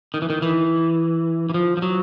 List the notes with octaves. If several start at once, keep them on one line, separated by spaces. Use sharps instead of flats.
D#3
E3
D#3
E3
E3
F3
F3
F#3